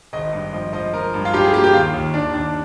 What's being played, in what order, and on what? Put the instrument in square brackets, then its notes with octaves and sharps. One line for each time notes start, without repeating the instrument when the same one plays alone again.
[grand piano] G#1 D#5
G2
F3 D#5
F3 D#5
F3 A#4
G2
F4
G2 G4
G#4
A#3 G4
G4
D#2 F4
D#2
D#2 D4
D#2 D4